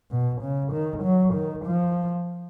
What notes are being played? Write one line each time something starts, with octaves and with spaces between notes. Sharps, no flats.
B2
C#3
D#3
F#3
D#3
F3